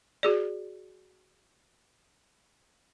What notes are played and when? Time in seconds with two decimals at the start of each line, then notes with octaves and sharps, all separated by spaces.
0.23 F#4 G#4 D5